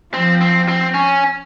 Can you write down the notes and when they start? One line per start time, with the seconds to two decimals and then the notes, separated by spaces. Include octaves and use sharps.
0.14 F3 C4
0.41 C4
0.68 C4
0.94 C#4